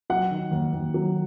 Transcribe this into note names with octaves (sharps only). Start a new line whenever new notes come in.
F#3 F#5
D#3
D#2
D#2
F#3